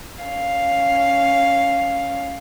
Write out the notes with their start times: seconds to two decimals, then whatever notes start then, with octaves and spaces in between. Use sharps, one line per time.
0.24 C#4 F5